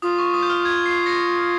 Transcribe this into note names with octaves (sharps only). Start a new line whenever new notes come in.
F4 D#6
C#6
D#6
G6
F6
G#6
C7
A#6 C#7